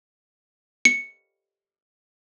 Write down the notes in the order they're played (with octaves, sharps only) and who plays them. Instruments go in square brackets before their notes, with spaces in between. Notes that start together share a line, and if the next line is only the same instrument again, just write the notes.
[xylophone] C#7